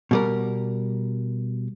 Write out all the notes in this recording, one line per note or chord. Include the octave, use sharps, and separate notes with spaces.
B2 G3 A#4